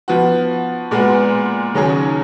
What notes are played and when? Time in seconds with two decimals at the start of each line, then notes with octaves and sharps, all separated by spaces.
0.08 F3 B3 F#4
0.91 A#2 G#3 B3 F#4
1.74 D#2 C#3 F#3 C#4 G#4